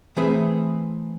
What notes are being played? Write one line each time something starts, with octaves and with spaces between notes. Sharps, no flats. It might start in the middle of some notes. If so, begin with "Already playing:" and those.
E3 A3 C4 G#4 B4 E5